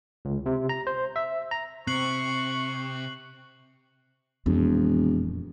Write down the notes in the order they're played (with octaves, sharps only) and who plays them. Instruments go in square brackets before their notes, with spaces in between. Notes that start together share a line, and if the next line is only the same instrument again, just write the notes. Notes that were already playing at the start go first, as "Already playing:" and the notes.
[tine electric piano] C#2
C3
A#5
C5
E5
A#5
[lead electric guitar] C3 [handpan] C4 [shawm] C#6 [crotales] F#6 C7 F#7
[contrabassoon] E1 [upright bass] F2 A#2